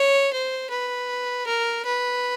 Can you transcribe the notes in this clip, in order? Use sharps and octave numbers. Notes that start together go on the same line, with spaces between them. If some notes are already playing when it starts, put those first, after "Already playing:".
Already playing: C#5
C5
B4
A#4
B4